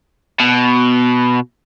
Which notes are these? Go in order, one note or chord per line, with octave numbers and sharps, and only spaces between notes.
B2